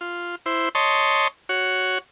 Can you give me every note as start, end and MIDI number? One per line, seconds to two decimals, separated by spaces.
0.01 0.35 65
0.46 0.69 64
0.46 0.69 72
0.75 1.28 73
0.75 1.28 75
0.75 1.28 81
0.75 1.28 84
1.49 1.98 66
1.49 1.98 73